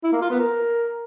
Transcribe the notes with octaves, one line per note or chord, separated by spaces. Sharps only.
E4
A#3
F4
B3
A#4